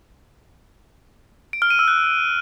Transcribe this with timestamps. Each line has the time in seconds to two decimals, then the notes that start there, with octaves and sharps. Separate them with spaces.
1.53 D7
1.62 F6
1.70 D#7
1.79 E6
1.88 F#6